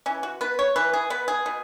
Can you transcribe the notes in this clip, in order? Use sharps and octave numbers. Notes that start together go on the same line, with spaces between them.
E3 C#4
F#4
B3 B4
C#5
E3 B4
G#4
B3 B4
G#4
B2